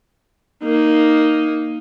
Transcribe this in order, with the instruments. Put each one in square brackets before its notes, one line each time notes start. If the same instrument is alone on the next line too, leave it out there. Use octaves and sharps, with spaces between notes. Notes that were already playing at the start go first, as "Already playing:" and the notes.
[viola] A#3 D#4